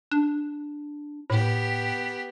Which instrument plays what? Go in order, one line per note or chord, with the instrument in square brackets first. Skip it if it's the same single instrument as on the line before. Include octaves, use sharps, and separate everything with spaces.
[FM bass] D4
[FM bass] A2 [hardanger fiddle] B3 G4